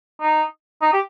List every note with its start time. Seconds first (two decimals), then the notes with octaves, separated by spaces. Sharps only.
0.21 D#4
0.82 D#4
0.93 G4